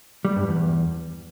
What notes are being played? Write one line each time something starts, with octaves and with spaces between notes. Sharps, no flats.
G3
G2
E2